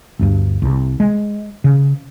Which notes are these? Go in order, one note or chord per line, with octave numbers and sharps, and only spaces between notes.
G1 D2 G2
C2
G#3
C#3